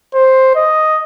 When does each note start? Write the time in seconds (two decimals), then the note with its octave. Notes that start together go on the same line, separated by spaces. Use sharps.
0.14 C5
0.55 D#5